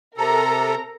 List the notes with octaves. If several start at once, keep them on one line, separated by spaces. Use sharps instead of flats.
C3 A4 A#4 A#5